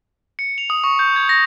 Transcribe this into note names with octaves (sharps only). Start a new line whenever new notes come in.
C#7
F7
D#6
C#6
G6
G#6
A#6